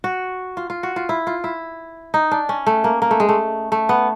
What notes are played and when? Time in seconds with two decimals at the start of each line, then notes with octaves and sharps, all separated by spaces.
0.04 F#4
0.57 F4
0.70 F4
0.83 F#4
0.96 F4
1.09 E4
1.27 F4
1.44 E4
2.14 D#4
2.31 D4
2.49 C#4
2.67 A3
2.84 A#3
3.02 A#3
3.11 A3
3.20 G#3
3.29 A3
3.72 A3
3.89 B3